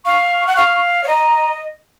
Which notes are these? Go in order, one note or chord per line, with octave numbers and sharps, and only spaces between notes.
F5 C#6
F#5
F5
C#5
D#5 A#5